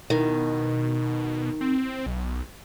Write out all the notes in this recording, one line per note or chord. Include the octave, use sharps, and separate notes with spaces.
B2 D#3
C4
B1